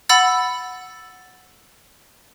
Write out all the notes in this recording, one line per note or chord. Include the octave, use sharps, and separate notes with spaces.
F#5 B5 E6 A6